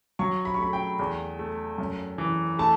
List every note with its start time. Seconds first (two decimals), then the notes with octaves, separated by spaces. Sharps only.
0.19 F#3 C#6
0.45 B5
0.54 C#6
0.59 A3 B5
0.73 G5
0.99 E2
1.39 A3
1.78 F#2
2.18 E3
2.59 A3 A5